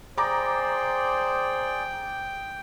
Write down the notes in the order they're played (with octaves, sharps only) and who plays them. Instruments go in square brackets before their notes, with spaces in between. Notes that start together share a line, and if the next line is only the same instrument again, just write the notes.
[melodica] G#4 D5 [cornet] C5 [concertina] G5 [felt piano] A#5 D6